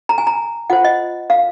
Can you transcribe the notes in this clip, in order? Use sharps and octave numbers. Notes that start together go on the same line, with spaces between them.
A#5
G#5
A#5
F4 C5 F#5
D#5
F5